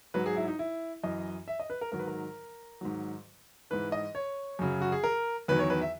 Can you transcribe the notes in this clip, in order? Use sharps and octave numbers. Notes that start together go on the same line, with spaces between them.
G#2 F#3 B4
G#4
E4
D#4
E4
F#2 E3 D#5
E5
D#5
B4
A#4
G#2 D#3 F#3 A#4
B4
A#4
G#2 D#3 F#3
G#2 E3 B4
D#5
C#5
F#2 C#3 F#3
F#4
G#4
A#4
E2 D#3 F#3 B4
C#5
B4
E5